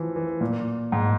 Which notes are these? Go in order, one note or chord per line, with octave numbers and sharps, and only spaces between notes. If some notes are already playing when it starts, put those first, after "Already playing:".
Already playing: E3 F3
E3
A#2
G#2